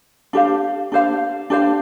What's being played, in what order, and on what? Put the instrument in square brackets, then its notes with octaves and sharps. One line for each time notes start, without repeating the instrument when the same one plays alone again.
[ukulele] D4 G4 C5 F5
D4 G4 C5 F5
D4 G4 C5 F5